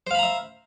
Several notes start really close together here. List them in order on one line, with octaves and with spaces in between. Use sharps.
C5 F5 B5 A#5 E5